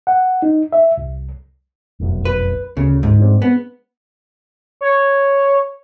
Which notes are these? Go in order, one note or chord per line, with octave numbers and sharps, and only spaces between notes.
F#5
D#4
E5
C2
F1 B1 F#2
B4
D2 C#3
G#2
G#3 C4 D4
B3
C#5